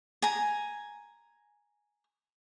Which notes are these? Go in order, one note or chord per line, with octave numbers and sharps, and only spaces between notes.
G#5 A#5